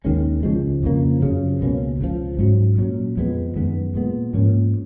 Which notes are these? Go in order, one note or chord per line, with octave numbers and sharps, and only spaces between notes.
D#2 D#3 G#3 C#4
C#2 C#3 F3 G#3
F2 C#3 F3 A#3
F#2 C#3 F3
C#2 B2 A#3 C#4
C#2 C#3 F3
G#2 F#3 C#4
A#2 F#3 C#4
F2 F3 G#3 B3
F#2 D#3 G#3 B3
A#2 G#3 B3
G#2 F3 A#3 C#4